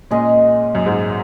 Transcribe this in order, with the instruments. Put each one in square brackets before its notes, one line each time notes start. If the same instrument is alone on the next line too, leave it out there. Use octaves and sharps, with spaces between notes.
[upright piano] A#2 [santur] G#3 C#4 G#4 D#5
[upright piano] F#2
G#2